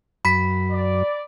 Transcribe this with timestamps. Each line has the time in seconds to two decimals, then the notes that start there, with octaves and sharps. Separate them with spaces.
0.25 F#2 B5 B6
0.71 D5